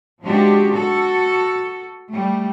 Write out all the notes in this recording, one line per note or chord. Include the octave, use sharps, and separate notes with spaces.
F3 G#3 C4 D4 F#4 G4
F#4 A4
G3 A3